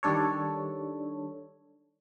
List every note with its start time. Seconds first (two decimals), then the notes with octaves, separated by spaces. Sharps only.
0.03 D#3 G3 D4 A4 C#5